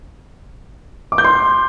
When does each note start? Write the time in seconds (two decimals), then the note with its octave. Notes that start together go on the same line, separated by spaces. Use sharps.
1.12 D6
1.18 G6
1.25 C6